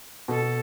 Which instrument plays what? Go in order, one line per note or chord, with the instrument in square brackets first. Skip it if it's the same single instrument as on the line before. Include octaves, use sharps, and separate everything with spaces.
[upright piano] B2 [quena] A4